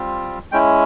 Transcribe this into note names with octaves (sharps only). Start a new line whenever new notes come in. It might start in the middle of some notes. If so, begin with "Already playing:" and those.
Already playing: G3 C4 F4
G#3 C#4 E4 G5